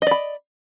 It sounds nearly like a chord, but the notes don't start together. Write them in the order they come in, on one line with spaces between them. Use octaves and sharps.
D#5 D5 B5